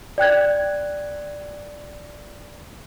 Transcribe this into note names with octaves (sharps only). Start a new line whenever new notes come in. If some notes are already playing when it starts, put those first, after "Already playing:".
D5 G5 F#6 G#6